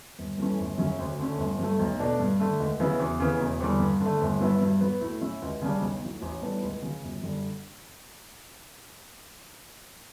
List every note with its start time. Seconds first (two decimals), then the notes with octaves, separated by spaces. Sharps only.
0.19 G1
0.38 G2 E3 A3 C#4
0.59 G1
0.78 F#2 C#3 F#3 C#4
0.99 D2
1.19 D3 A3 C#4
1.38 G1
1.58 G2 F#3 A3
1.79 B1
2.00 B2 A3 D4
2.20 G2
2.40 D3 A3
2.60 C#2
2.80 C#3 F#3 B3 E4
3.00 E2
3.20 C#3 E3 B3
3.40 E1
3.60 E2 D3 G3
3.80 G2
4.01 D3 A3
4.21 G1
4.40 G2 F#3 B3 E4
4.61 G2
4.81 F#3 B3
5.01 A2
5.21 F#3 C#4 E4
5.42 C#2
5.62 C#3 G3 D4
5.81 B1
6.02 A2 F#3
6.22 A1
6.42 A2 G3 B3 D4
6.62 C#2
6.82 C#3 F#3
7.03 G1
7.23 F#2 D3 G3